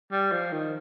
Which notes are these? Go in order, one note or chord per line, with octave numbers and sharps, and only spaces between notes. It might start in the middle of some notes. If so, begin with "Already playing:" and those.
G3
F3
D#3